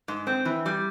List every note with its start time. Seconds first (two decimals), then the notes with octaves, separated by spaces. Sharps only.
0.08 G#2
0.27 C4
0.45 E3
0.66 G3